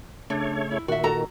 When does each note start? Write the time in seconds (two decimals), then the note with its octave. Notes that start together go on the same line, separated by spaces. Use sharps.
0.30 C#3 A3 D4 C#5
0.71 E4
0.88 A#2 D#3 F#4 E5
1.04 F#4 A4 A#5